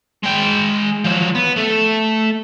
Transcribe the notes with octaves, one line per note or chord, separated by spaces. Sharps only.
G#3 G5
F3 F#3
B3
A3